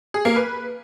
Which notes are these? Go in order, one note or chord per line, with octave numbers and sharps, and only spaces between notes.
G#4
A#3
B4